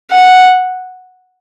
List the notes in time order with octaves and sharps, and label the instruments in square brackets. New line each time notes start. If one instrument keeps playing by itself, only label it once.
[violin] F#5